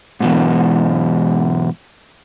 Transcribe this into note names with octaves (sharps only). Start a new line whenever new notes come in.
G#2 B2 E3